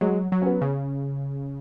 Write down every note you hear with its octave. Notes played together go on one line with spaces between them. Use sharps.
F#3 G#3
F#3
C#4
B3
C#3